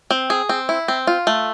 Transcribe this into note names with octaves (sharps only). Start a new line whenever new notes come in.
C4
G#4
C4
E4
C4
F4
A3